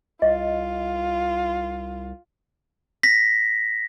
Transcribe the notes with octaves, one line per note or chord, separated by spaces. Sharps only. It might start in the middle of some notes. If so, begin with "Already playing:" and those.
C2 F4 D#5
A#6 B6